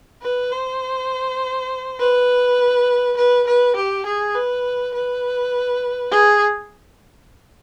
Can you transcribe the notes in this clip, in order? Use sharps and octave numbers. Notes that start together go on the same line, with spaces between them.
B4
C5
B4
B4
B4
G4
G#4
B4
B4
G#4